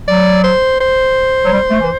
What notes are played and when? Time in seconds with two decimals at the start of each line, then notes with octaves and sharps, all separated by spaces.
0.07 F#3 D5
0.44 C5
0.80 C5
1.44 F#3
1.52 G3
1.70 A3
1.81 E3